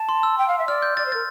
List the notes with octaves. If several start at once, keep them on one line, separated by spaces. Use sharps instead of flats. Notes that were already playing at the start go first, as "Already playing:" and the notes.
Already playing: A5
C6
E6
G5
F5
E5
D5 F6
G6
D5 A6
C5
A#4 A6